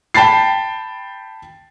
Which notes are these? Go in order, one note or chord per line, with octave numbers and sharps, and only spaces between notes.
G5 A5 B5 A6 C7